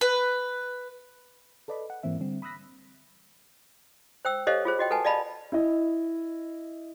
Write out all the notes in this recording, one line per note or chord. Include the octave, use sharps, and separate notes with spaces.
B4
A4 B4 D5 D#5 B5
F#5
G#2 E3 A#3 C4 E5
D3 G3 C4
B5 D#6 E6 F#6 A#6 B6
C5 G5 E6
G4 A4 C5 C#5 D#5 F5
F4 G#4 C5
F#4 D#5 G5
A4 B4 F#5 G#5 A5
D5 D#5 F5 A5 B5
E4 D#5